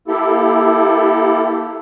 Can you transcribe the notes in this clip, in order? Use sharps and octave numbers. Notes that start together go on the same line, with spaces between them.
A#3 E4 G4 A4